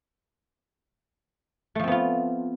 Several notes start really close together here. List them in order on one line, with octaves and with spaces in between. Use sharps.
A3 F3 C4 B3 F4